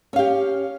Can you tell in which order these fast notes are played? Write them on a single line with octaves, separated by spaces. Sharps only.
C#4 F5 G4